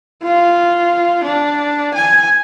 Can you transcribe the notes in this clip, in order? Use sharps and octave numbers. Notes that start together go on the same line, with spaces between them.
F4
D4
G#5